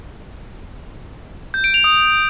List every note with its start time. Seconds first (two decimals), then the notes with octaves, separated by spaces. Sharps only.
1.54 G6
1.64 D7
1.74 F7
1.84 D#6